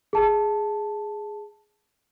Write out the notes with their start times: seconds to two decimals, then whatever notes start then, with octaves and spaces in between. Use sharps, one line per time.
0.13 G#4 A5